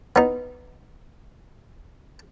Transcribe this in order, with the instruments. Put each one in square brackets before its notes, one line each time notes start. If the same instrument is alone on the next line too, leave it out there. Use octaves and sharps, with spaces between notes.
[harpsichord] B3 D#4